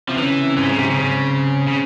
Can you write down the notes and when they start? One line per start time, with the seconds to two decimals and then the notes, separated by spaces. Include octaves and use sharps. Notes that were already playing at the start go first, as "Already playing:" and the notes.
0.08 C3 F3
0.17 C#3 E3
0.38 C3
0.57 G#2 E3
0.69 C#3
0.78 G#2 C3
0.90 C#3
0.98 G#2
1.68 C#3